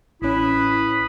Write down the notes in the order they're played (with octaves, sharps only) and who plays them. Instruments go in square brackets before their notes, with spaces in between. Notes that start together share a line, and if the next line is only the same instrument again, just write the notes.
[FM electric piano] A1 C#4 [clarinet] E4 [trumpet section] B4 B5 D#6